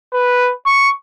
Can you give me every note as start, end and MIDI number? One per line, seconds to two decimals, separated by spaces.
0.13 0.51 71
0.66 0.90 85